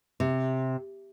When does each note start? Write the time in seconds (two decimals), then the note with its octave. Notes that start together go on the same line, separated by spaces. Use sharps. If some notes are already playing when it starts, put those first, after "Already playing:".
0.20 C3